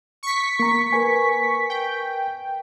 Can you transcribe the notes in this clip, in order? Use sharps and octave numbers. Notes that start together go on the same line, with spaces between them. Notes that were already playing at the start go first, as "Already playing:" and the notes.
C#6 B6
A#3 A#5
A#4 B4 G#5
G5